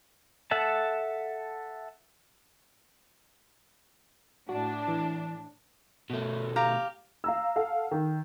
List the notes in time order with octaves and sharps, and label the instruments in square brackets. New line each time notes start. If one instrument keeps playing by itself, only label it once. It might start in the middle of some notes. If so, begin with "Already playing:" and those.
[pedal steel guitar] A4 E5 F#5 A5
[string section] A2 D4 [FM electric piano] F#4
[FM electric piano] E3
[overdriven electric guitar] B2 A3
[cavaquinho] G4 F5 A#5
[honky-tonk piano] F5 A#5 E6
A4 F5 F#5
D#3